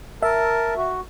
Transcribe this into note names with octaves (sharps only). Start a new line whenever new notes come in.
A#4 E5 A5
F#4